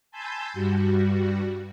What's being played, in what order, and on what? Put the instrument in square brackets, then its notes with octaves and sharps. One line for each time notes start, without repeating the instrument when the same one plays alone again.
[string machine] G#5 A5 B5 C6 E6 G6
G2 G3 F#4